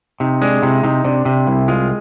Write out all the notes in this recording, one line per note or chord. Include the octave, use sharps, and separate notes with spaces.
C3 D#4
G#3 D4
C3 E4
C3 D#4
C3 D4
C3 D4
C2 E4
G#3 F4